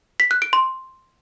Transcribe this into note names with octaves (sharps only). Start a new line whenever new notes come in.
B6
F#6
D7
C6